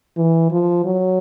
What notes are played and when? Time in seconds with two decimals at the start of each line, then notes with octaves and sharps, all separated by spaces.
0.17 E3
0.51 F3
0.85 F#3